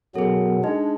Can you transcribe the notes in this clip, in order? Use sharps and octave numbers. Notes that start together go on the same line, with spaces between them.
F#2 B2 F#3 B3 G#4 A4
G#3 D4 D#4